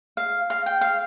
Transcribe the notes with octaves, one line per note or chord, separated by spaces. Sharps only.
F5
F5
G5
F5